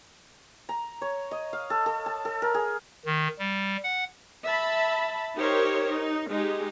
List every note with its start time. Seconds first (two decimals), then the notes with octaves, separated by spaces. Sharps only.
0.69 A#5
1.02 C#5
1.31 D#5
1.53 F5
1.70 A4
1.86 A4
2.06 A5
2.25 A4
2.42 A#4
2.54 G#4
3.05 D#3
3.39 G3
3.84 F#5
4.45 E5 A5 B5
5.37 D#4 G4 A#4 C5 C#5
5.88 D#4
6.30 G#3 D#4 G4